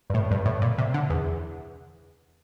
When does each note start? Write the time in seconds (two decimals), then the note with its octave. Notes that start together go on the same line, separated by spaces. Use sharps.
0.10 G2
0.14 A2
0.31 G2
0.46 A2
0.62 A#2
0.78 C3
0.94 D3
1.10 E2